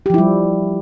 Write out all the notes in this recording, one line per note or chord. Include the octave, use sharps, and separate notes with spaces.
F3 G3 E4 G4